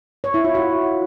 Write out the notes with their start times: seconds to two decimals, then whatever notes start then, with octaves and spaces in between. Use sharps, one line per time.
0.24 C#5
0.34 E4
0.44 F4
0.55 F#4